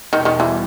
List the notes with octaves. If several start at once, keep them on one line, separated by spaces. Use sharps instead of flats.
E2 B2 D#3 G3
D#3
E3